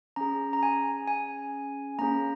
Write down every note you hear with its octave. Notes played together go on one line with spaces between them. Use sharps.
C#4 G#4 A#5
A#5
G#5
G#5
A#3 C#4 G#4 A#5